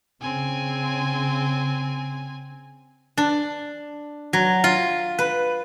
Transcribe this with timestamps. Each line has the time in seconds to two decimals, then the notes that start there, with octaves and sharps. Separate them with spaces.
0.21 C#3 C4 G#5
3.17 D4
4.33 F#3
4.64 F4
5.19 B4